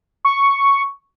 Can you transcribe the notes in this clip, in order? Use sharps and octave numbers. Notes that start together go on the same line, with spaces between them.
C#6